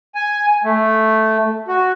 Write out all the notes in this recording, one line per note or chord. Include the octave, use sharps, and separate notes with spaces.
G#5
A3
F#4